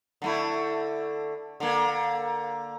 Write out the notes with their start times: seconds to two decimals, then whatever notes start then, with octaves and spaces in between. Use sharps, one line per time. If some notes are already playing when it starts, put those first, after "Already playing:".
0.22 D3 A3 E4
1.60 D3 A#3